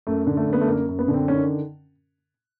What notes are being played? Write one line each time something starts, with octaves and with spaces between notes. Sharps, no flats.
F#2 A3
D3
A3
F#2
B3
A3
F#2 A#3
F#2
B3
D3
C4
D#3 C#4